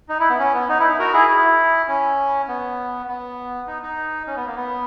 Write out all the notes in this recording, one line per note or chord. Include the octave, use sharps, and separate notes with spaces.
D#4
E4
B3
C#4
B3
D#4
E4
D#4
F#4 A#4
E4 G#4
E4
C#4
B3
B3
D#4
D#4
C#4
B3
A#3
B3